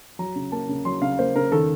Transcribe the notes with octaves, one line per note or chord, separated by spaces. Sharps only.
F#3 A#5
C#3
A#3 A5
C#3
F#3 C6
C#3 F5
A#3 C5
C#3 A#4
D#3 A4